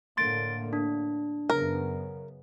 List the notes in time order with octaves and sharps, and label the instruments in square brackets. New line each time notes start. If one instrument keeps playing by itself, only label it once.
[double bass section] A2 D3 A#3 [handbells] C6 A6 D7
[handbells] D4
[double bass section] F#2 C#3 B3 [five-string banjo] A#4